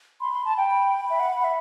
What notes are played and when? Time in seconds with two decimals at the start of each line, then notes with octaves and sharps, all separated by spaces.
0.20 B5 C6
0.33 C6
0.45 A5
0.58 G5
0.71 B5
1.10 E5
1.20 F#5
1.36 F#5
1.44 E5